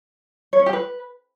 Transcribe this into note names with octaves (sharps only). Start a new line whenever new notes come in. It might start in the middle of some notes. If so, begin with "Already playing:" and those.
C#5
C#4
G4
B4